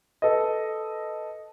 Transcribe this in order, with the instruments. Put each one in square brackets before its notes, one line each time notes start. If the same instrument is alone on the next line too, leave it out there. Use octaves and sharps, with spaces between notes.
[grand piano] A4 B4 D#5